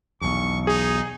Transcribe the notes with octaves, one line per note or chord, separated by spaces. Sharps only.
B1 E2 C#6
D#4 G#4